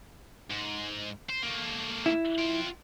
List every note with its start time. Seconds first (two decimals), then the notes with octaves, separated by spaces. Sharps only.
0.50 G#2
1.29 C5
1.42 A3 A#3
2.06 E4
2.38 F4 G5